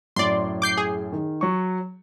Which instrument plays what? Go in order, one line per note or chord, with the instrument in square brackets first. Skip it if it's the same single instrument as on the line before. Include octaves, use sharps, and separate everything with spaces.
[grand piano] F#2 A2 [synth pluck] D5 C6
[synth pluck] D6 G6 C7
G#4
[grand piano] D#3
F#3 C#6